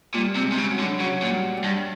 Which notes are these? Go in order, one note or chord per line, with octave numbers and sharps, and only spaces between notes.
A#2 G3
C3
G#3
C3
C#3
F#3
D3
C#3 F#3
A#2
G3
G3
G2